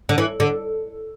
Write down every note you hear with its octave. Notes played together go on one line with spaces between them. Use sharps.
D3
E3
D3